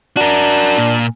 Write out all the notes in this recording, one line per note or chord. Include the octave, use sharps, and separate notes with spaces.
D4 F#4 A#4
A#2